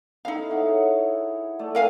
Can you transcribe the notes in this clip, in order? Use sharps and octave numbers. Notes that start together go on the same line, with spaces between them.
D#4 E4 A4 F5
G#4 C#5 F#5
A3 D5 A5
A#4 F5 G#5